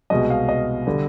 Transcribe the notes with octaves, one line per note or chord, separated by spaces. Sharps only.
C2 B2 G#3 D#5
F5
D#5
D3 G3